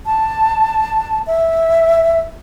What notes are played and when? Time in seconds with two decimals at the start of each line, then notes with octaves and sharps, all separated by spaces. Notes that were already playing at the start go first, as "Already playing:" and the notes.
0.06 A5
1.27 E5